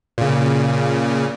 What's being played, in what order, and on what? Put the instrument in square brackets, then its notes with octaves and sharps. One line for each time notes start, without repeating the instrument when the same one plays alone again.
[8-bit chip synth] A#2 C#3